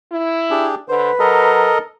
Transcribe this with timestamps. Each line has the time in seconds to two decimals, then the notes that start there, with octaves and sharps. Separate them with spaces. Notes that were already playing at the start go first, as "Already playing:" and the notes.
0.12 E4
0.51 D4 G4 G#4
0.89 D3 B4 C5
1.20 F#3 A4 A#4 D#5